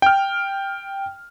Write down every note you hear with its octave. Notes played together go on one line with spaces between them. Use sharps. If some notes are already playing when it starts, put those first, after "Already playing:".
G5 F6